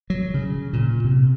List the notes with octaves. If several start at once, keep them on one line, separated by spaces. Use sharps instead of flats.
F#3
C#3
A#2
C3